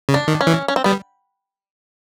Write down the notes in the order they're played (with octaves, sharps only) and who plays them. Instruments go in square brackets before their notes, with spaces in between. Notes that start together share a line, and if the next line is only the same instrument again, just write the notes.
[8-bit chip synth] C#3
[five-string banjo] D4
[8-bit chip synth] D#3
[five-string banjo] C#4
[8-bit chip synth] E3
[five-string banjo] C#4
C4
[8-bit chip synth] G3 [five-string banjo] B3